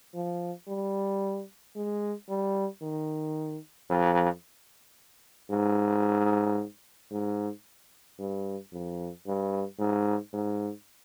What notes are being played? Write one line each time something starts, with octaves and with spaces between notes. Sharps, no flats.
F3
G3
G#3
G3
D#3
F2
G#2
G#2
G2
F2
G2
G#2
G#2